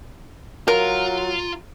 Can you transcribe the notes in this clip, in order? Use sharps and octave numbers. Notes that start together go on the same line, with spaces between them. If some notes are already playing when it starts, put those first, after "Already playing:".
F#3 F4 A#4